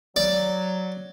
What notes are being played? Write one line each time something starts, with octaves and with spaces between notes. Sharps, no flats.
F#3 D5